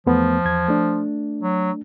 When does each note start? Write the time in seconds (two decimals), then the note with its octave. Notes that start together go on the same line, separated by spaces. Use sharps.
0.06 E2 F3 A3 B3
0.45 E2 G#6
0.68 A3 D4
1.43 F#3